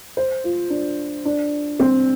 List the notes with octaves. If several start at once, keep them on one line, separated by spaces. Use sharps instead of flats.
C5
F4
D4
D4
C4